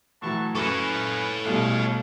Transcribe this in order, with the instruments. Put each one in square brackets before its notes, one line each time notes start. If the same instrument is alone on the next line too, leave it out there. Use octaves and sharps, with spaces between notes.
[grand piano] A2 E3 F#3 [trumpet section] F#5 A5 C#6
[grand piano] F#2 C#6 [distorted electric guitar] A4 C#5 [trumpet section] B4 F5 G#5
[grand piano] B1 [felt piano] B2 G3 A3 [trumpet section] F4 G#4 F5